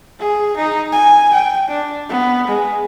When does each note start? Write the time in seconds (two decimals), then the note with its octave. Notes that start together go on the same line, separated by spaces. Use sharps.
0.19 G#4
0.57 D#4
0.93 G#5
1.34 G5
1.69 D4
2.09 B3
2.48 G#3